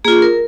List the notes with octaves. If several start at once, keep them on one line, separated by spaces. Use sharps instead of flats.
A#3 F4 G#4
A#4